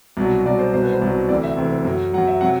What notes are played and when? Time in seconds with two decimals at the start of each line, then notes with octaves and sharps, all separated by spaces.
0.17 C2 B2 F#3
0.45 C2 B2 F#3 D5
0.59 C5
0.73 C2 B2 F#3 C5
0.83 B4
0.92 C5
1.02 C2 B2 F#3
1.29 D2 C3 E3 D5
1.43 E5
1.57 D2 C3 E3
1.85 F#2 F#3
2.13 F#3 F#5
2.18 F#2
2.27 E5
2.41 C3 F#3 F#5